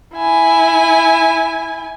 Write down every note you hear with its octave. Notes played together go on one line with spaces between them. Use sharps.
E4 G#5